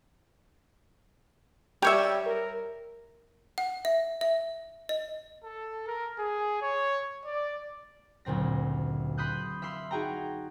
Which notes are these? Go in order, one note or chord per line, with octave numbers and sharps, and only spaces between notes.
G3 G4 C#5 E5
A#4
F#5
E5
E5
D#5
A4
A#4
G#4
C#5
D5
F#1 D2 A#2 C4 A#6
B5 C6 D#6 F#6 G6
E5 F5 B5 C6
D#4 F#4 G#4 G5 A#5